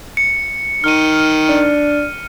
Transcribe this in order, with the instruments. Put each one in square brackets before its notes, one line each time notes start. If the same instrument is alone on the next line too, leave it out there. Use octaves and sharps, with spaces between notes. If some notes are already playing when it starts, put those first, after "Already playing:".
[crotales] C#7
[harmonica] D#3 [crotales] F6 D#7
[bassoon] D4